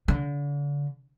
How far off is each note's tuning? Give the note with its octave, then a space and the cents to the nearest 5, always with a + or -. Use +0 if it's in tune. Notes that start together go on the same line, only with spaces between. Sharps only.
D3 -35